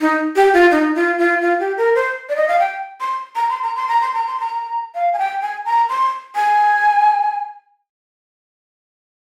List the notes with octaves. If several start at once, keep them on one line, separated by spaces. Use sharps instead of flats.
D#4
G4
F4
D#4
F4
F4
F4
G4
A#4
C5
D5
D#5
F5
G5
C6
A#5
C6
A#5
C6
A#5
C6
A#5
C6
A#5
F5
G#5
G5
G#5
A#5
C6
G#5